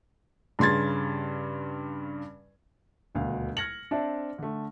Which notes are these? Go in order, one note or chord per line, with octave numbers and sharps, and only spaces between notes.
G2 C#3 C6 G#6 A6
D#1 D2 B2 F5
F6 G#6 A#6 C#7 F#7
C4 D4 C5 D5 E5 A5
D3 A3